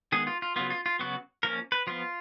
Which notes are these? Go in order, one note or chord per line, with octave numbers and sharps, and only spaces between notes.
D#3 G#3 B3 G#4
F4
F4
C#3 F#3 B3 F4
F4
F4
C#3 F#3 B3 F#4
F3 A#3 C#4 A#4
B4
F3 B3 F4